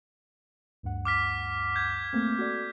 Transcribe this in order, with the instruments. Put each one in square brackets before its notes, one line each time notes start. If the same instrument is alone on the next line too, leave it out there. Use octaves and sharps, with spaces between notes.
[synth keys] D2 G2 F#5
[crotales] D6 F6 B6
G6 G#6
[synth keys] A3 A#3 C4
F#4 A4 D5